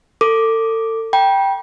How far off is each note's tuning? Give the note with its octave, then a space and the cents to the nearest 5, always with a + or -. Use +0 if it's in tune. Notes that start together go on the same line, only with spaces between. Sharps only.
A4 +35 D6 +0
G5 +0 B5 -45